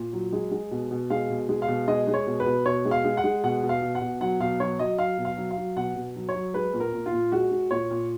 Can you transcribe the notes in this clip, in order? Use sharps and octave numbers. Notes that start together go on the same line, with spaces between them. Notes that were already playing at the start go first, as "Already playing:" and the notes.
Already playing: A#2
F#3
G#3
G#3
B2
B2
G#3 F5
B2
G#3
F5
B2
G#3 D#5
G#3
C#5
B2
B4
B2
B2 C#5
G#3
F5
G#3
F#5
G#3
B2 F#5
B2
F5
B2
F#5
B2
F#3 F#5
B2 F5
F#3 C#5
F#3 D#5
F#3 F5
B2
F5
F#3
F5
F#3
B2 F#5
B2
F#3
C#5
F#3
G#3 B4
A#2
A#4
A#2
F4
A#2
G#3 F#4
G#3
A#2 C#5
A#2